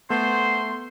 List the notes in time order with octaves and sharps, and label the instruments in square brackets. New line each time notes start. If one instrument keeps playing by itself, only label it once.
[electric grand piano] A3 [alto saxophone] B3 [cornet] C5 [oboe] C6